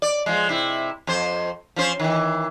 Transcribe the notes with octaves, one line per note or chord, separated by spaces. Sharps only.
D5
F3 G#3
C3 E4
F2 C5
F3 C#4 C5
D#3 E3